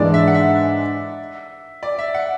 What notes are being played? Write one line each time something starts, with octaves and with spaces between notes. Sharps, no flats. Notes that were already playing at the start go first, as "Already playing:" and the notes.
Already playing: G#2 E3 G#3 D4 D5
E5
F#5
E5
D5
E5
F#5